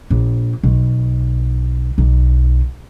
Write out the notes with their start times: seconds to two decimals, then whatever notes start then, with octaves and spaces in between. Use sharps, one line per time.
0.10 A#1
0.63 B1
1.98 B1